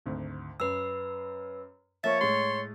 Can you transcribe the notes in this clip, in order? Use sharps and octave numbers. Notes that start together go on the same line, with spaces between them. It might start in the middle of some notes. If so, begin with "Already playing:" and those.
G#1 D2
F#2 B4 E6
F3 A#3 C#5 E5 A6
A2 G#3 C6